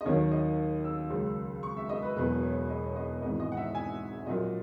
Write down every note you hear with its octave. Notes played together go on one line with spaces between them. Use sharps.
D#5
D#2 D#3 F#3 C#5
C#5
D#5
E6
C#2 C#3 F#3
C#6
E5
D#5
B4
E1 E2 B2 F#3 B4
C#5
D#5
C#5
D#5
G#1 G#2 E3 D#5
D#5
F#5
E5
G#5
A#1 A#2 F#3 D#5